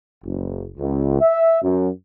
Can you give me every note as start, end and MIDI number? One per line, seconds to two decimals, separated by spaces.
0.24 0.66 30
0.78 1.20 37
1.20 1.59 76
1.62 1.88 42